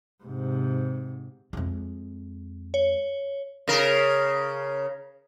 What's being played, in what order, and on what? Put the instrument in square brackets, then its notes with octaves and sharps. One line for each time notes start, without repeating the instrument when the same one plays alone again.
[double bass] G#2 C3
[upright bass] F2 G#3
[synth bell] C#5
[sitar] C#3 A#4